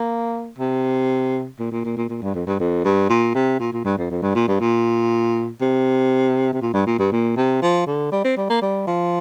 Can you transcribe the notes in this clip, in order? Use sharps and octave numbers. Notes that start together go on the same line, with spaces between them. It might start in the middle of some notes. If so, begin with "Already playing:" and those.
Already playing: A#3
C3
A#2
A#2
A#2
A#2
A#2
G2
F2
G2
F2
G2
A#2
C3
A#2
A#2
G2
F2
F2
G2
A#2
G2
A#2
C3
C3
A#2
G2
A#2
G2
A#2
C3
F3
D3
G3
C4
G3
A#3
G3
F3